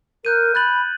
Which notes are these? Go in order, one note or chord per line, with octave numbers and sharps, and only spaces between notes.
A#4 F#6 G6 D#7
B5 F#6 A6 F#7